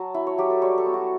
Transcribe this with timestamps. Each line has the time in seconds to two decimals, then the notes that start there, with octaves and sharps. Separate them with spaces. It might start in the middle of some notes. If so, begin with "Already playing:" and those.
Already playing: F#3 A5
0.14 E4
0.27 C#5
0.38 F#3 G4
0.50 A4
0.62 G3 C#5
0.78 A4
0.85 B3
0.94 F#4